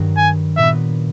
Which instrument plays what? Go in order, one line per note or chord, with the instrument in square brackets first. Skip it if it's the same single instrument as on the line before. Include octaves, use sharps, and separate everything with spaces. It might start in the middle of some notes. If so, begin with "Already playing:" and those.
Already playing: [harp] G2 D#3 F#3
[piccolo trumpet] G#5
[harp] A#2 F#3 B3 [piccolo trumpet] E5